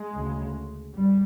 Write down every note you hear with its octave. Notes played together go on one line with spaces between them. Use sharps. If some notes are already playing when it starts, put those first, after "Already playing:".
Already playing: G#3
D2 C#3
G#1 G3